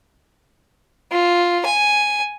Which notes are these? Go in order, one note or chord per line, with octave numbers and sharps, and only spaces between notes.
F4
G#5